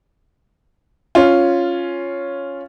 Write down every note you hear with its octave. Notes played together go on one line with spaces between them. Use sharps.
C#4 F4